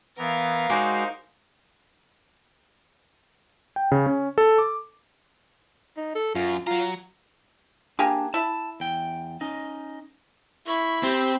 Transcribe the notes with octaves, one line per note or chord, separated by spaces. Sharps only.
E3 B3 A#4 F5
G#3 D#4 F#4 C5 D5
G5
C#3
C#4
A4
D6
D#4
A4
F#2 F4
F#3 F4 A#5
A#3 D4 G4 G#4
E4 A5
E2 G5
C#4 D#4 D#5
E4 B5 C#6
C4 G4